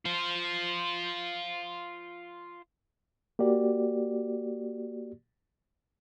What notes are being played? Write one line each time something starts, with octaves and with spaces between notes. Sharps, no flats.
F4 C5
A#3 F#4 G4 D5